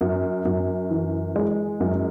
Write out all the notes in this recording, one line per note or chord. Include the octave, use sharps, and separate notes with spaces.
F#2
F#2
E3
G#3
F#2